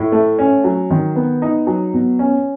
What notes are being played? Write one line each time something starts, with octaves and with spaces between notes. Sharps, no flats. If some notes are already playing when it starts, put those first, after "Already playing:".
Already playing: A2
A3
C#4
F#3
D#3
B3
D#4
F#3
B2
C#4